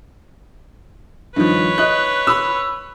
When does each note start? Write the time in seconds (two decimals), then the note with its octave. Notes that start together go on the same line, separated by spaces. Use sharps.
1.36 G2 D#3 F3 B4 C#5
1.78 D#5 F#6
2.27 B5 E6